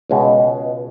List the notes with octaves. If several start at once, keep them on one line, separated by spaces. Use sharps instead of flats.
C#2 B2 G#3